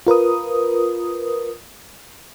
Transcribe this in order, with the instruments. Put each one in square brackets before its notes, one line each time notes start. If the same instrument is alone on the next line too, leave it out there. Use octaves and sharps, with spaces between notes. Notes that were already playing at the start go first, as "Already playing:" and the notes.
[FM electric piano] F4 A#4 B4 D#6